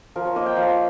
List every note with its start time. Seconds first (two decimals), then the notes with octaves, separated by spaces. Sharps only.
0.16 F3 A#4
0.25 C#5
0.36 A#3 D#4 D#5
0.46 G5
0.56 F3 F5